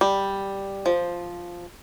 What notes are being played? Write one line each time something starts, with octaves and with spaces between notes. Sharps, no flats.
G3
F3